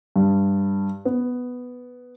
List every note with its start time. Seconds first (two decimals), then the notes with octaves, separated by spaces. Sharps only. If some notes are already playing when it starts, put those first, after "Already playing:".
0.16 G2
1.05 B3